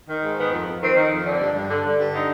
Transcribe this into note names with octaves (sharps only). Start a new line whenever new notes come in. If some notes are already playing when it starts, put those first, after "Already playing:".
D#3
G#2
D#3 B3
F2
F2
D#3 C4
D#3
F2
D3 D4
G2
G2
D3
D3
G2
D3 D#4